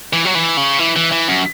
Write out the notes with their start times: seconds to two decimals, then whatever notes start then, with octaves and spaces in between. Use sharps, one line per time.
0.13 E3
0.25 F#3
0.35 E3
0.57 C#3
0.79 E3
0.96 E3
1.12 E3
1.28 F#2